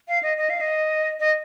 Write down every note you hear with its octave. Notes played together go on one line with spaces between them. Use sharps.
F5
D#5
D#5
F5
D#5
D#5